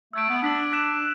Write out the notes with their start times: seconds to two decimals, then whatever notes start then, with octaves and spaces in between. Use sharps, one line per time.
0.13 A3 E6 G#6 D7
0.28 B3
0.42 D4 E6 B6 F#7
0.72 D6 F#6 B6 E7